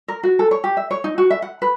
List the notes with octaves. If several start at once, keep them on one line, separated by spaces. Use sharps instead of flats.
A#4
F#4
A4
C#5
G4
E5
C#5
D#4
F#4
E5
F#5
B4